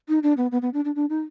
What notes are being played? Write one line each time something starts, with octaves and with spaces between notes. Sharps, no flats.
D#4
D4
B3
B3
B3
D4
D4
D4
D#4